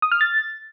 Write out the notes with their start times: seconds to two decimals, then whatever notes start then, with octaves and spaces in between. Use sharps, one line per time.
0.02 D#6
0.12 F6
0.21 A6